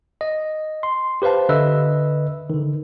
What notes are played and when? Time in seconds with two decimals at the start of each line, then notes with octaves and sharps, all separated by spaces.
0.21 D#5
0.83 C6
1.22 G4 B4 C5 F5 A5
1.49 D3 B4 D#5 E5 E6
2.50 D3 D#3